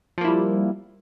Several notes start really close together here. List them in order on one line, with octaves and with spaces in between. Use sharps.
F3 A#3 E4 G3